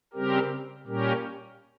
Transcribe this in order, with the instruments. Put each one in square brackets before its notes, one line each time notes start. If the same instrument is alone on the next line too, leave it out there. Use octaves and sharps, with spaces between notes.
[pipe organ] C#3 G3 C4 G4 A#4
A#2 G3 C#4 G4 A#4